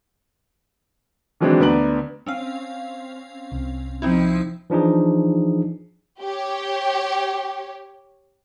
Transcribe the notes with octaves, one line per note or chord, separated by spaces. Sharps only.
D#3 E3 F#3 G#3 C4 D4
D2 B3 D5 A#5 F#7
C4 C#4 F5
C2
F3 C4 D#4 E4
E3 F3 D4 D#4 G#4
G4 C#5